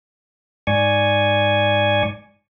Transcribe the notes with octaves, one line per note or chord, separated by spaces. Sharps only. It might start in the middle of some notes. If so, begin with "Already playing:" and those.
G#2 D5 G#5 C#6